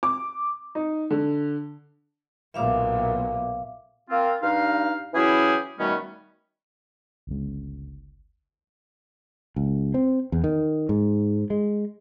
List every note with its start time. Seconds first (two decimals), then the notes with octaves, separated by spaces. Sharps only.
0.03 D6
0.75 D#4
1.10 D3
2.54 B1 A#2 E5 F5 D6
4.10 A#3 C4 F4
4.41 G2 D#4 F5
5.14 E3 F#3 C#4 E4 G4 G#4
5.79 B2 D#3 G3 A3 B3 C#4
7.27 G1 C#2
9.56 C#2
9.94 C4
10.32 E2
10.44 D#3
10.89 G#2
11.50 G#3